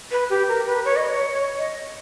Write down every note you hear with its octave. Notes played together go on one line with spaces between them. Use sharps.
B4
G4
A#4
B4
C#5
D#5
C#5
D#5